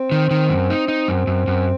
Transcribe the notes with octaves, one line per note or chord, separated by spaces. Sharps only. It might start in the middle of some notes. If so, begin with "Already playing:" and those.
Already playing: C4
D#3
D#3
F#2
D#4
D#4
F#2
F#2
F#2